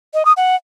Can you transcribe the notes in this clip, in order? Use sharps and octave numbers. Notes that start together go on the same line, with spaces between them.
D#5
D#6
F#5